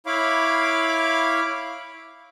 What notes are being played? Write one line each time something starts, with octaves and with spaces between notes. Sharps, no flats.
E4 C#5 F5 B5 D6